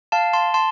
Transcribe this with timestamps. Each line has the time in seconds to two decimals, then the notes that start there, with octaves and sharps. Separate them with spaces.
0.12 F5 A5
0.33 A5 C6
0.54 A5 C6